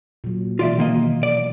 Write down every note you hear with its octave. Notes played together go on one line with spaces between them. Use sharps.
A#2 F#3
B2 E3 G#3 F4 D5 E5
D#3 A#3 D#5
D5